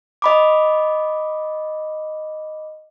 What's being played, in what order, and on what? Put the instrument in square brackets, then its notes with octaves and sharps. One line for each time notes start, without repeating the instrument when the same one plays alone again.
[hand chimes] D#5 B5 D6